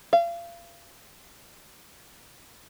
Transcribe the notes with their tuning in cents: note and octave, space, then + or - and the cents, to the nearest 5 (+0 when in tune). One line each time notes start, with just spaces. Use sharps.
F5 -35